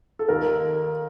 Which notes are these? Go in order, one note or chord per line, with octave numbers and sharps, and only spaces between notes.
A4
D#2 A#4